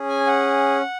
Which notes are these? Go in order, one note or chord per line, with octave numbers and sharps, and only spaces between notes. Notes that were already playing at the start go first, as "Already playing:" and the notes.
Already playing: C#4 G#4
G#5
F#5